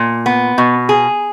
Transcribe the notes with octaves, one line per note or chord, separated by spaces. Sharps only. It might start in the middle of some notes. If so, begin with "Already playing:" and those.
Already playing: A#2
B3
B2
G#4